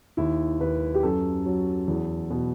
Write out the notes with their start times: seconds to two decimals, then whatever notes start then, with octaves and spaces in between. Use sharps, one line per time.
0.17 D#2 E4
0.61 D#2 B4
0.94 G4
1.03 F#2 A4
1.46 F#3
1.87 E2
2.30 B2